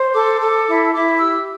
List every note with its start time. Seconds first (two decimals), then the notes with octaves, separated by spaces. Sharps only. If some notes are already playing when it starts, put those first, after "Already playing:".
Already playing: C5
0.14 A4 D6
0.41 A4
0.67 E4
0.93 E4 D6
1.19 G4 E6